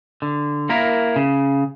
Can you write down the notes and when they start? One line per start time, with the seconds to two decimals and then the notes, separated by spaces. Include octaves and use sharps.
0.22 D3
0.69 A#3 E4 A#4
1.16 C#3